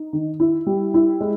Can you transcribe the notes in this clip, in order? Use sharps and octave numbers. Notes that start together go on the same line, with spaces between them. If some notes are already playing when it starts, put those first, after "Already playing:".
Already playing: D#4
D#3
E4
G3
E4
G#3